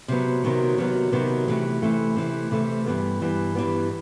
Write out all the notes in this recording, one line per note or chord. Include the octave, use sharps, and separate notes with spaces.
C3 D#3 F#3 B3
C3 D#3 F#3 B3
C3 D#3 F#3 B3
C3 D#3 F#3 B3
C3 E3 A3
C3 E3 A3
C3 E3 A3
C3 E3 A3
G2 E3 G3 B3
G2 E3 G3 B3
G2 E3 G3 B3